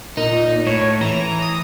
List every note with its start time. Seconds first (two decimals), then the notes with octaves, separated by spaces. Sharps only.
0.17 A#2 D#4
0.67 A2 C#5
1.01 E3 A#5
1.42 D#6